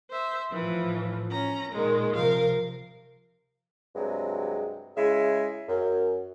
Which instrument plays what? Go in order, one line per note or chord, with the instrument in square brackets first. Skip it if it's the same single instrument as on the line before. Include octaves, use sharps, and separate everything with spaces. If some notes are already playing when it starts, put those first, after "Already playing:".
[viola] C5 E5
[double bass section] A2 F3 [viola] E3
[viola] C#4 A#5
[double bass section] A#2 [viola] D#3 G#3
[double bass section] C3 F3 [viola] A#4 F5
[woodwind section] G2 C3 F#3 G#3
C#3 G#3 E4 E5
F#2